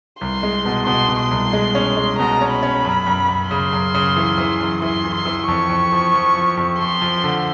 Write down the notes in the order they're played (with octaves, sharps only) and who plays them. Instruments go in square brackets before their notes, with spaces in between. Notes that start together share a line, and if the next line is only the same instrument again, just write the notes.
[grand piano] C2 [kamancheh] C6
[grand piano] G#3
B2
[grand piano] B2 [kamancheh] C6
[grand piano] B2
[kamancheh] C6
[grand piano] C2
G#3
C#4
G#3
[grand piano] B2 [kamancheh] A#5
[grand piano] C#4
[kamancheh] B5
[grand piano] C#4
F#2
F#2
F#2
[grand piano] C#3 [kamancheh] C6
[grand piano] F#2
C#3
E3
E3
F#2
[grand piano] E3 [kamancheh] C6
[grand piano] E3
[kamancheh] C6
[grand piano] E3
[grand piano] F2 [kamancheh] C#6
[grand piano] F2
F3
F3
F3
F2
[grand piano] F3 [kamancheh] C6
[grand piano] F3
D3